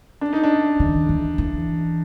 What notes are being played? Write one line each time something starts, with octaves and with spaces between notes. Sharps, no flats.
D4
D#4
D4
D#3
E3
E3